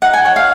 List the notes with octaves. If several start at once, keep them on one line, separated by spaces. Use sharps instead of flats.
D#4 F#5
G#5
C#5 F#5
F5